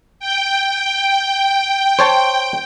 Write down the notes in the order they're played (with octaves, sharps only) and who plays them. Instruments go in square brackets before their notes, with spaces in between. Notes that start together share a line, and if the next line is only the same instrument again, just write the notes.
[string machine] G5
[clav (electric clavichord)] C5 C#5 A5